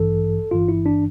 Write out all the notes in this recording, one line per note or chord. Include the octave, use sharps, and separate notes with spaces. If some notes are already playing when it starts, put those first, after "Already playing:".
Already playing: A1 G2 E3 A4
G1 G2 E3 F4
E4
D4